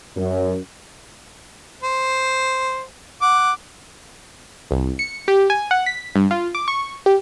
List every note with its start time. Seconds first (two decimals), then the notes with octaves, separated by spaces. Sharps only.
0.16 F#2
1.83 C5
3.22 F#5 D6
4.71 C2
4.99 C#7
5.28 G4
5.50 G#5
5.71 F#5
5.86 B6
6.16 G2
6.31 F4
6.55 D6
6.68 C#6
7.06 G4